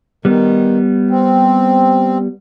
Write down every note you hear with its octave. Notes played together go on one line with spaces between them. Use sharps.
D#3 G3 B3
C4